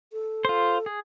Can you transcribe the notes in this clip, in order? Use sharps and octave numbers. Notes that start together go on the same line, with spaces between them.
A4
F4 C5
G#4